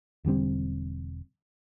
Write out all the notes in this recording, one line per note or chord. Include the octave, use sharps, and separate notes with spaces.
E1 D3 G3 C4